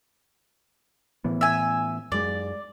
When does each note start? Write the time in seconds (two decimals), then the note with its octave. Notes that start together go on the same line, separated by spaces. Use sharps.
1.24 A2 E3 B3
1.41 E5 G#5
2.12 F#2 G#3 D5